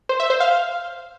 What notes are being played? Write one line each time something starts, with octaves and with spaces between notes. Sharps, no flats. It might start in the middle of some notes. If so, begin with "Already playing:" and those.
C5
E5
C5
F5